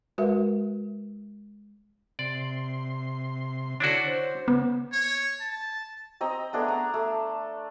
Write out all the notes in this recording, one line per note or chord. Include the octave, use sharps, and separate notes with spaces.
G#3 F#4 A#4 B4 E5
C3 D5 C6
D3 D4 E4 F#4 C#5
C5
C#3 B3
C#5
A5
C4 D#5 A#5
A3 B3 D4 G#4
A#5
A3